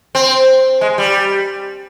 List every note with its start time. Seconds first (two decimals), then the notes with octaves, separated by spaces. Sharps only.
0.15 C4
0.81 G#3
0.98 G3